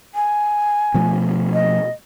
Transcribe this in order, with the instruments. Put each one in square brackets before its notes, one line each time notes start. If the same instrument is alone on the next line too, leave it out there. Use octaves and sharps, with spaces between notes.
[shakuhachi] G#5
[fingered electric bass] B2 F3 A3
[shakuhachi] D#5